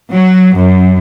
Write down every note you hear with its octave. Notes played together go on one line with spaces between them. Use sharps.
F#3
F#2